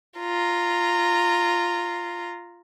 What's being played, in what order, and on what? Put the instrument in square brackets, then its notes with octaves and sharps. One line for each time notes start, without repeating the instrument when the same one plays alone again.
[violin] F4 A#5